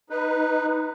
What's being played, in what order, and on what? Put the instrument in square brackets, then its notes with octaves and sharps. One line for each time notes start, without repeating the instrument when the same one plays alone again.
[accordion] D#4 B4